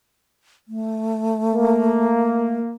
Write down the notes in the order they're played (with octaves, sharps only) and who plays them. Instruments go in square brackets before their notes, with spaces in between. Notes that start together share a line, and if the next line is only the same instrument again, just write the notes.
[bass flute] A3
[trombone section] A#3